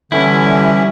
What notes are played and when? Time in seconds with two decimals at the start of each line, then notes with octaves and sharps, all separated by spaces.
0.12 D3 E3 G3 C#4 E4